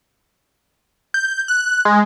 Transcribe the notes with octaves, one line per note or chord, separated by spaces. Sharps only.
G6
F#6
G#3